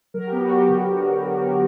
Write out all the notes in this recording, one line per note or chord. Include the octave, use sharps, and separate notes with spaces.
F#3 A#4
G4
B3
F#4
F#3 G4
D3
D3
F#3
F#3
F#3